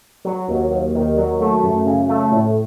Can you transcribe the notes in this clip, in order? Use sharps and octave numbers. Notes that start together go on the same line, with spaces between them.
F#3
D#2
D#2
D#3
F#3
A3
F#2
C#3
A3
A2